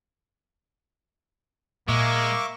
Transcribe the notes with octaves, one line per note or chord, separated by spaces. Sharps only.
A#2 G#3 A#3 E5 C#6 D6